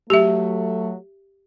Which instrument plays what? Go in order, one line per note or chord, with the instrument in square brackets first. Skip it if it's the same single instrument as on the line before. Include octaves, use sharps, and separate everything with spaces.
[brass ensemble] F#3 A3 [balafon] G4 E5